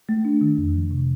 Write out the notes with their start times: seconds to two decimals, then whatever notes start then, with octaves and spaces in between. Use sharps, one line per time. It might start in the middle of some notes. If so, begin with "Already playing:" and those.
0.09 A3
0.25 D4
0.41 D#3
0.58 F2
0.74 F3
0.91 C3